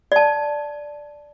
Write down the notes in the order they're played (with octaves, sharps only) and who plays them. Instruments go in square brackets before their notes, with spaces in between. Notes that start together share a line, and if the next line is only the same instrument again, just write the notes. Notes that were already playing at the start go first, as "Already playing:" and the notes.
[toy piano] D5 A5